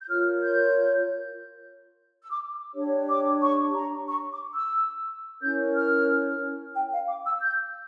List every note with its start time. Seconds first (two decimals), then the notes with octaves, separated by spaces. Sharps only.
0.01 G6
0.08 F4 A#4 C#5 F6
0.42 G6
2.23 E6
2.31 D6
2.75 D4 G4 C#5
3.08 D6
3.42 C#6
3.75 A#5
4.09 C#6
4.31 D6
4.53 E6
5.41 C#4 E4 A#4 C#5 G6
5.75 F6
6.75 G5
6.92 F5
7.08 D6
7.25 E6
7.42 G6